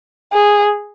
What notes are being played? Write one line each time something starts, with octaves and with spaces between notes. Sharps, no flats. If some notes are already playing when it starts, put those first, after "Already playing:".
G#4